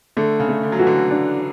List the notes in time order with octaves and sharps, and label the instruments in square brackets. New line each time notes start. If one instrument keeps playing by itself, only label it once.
[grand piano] D3 [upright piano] A3
[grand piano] C#3
[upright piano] A3
[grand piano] D3
F#3
[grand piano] E3 [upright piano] F#4
[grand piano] D3
[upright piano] D4